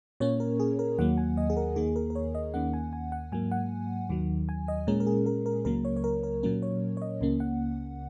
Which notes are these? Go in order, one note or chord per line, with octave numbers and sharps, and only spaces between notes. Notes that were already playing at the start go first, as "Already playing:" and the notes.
A#2 A#3 C#4 C#5
A#4
G#4
A#4
D#2 D#3 F#3 A#3 F#5
G#5
D#5
G#4
A#4
D#2 D#3 A#3 G#4
A#4
A#4
C#5
D#5
D#2 D#3 A#3 C#4 F#5
G#5
G#5
F#5
G#2 F#3 A#3 G#5
F#5
D#2 D#3 F#3
G#5
D#5
A#2 G#3 C#4 A#4
A#4
G#4
A#4
A#4
C#2 C#3 F#3 A#3 A#4
C#5
C#5
A#4
A#4
A#2 F#3 A#3 C#4 A#4
C#5
C#5
D#5
C#2 C#3 A#3 C#4
F#5